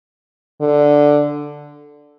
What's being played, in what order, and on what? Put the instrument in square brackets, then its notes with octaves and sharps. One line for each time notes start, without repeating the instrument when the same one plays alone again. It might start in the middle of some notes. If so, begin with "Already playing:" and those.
[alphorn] D3